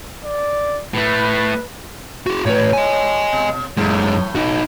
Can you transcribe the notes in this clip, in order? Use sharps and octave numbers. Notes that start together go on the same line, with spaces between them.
D5
A2 A3 B4
F#4 G#4
A2 B4 C#5
A2 D#5 G#5
B2
F#2 A2 E3 G#3 A3
D#4 F#4